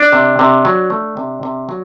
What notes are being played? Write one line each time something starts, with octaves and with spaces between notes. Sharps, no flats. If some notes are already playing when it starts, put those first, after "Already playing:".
Already playing: D4
C3
C3
F#3
A3
C3
C3
F#3